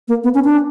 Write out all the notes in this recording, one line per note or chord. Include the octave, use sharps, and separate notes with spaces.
A#3
B3
C#4
D4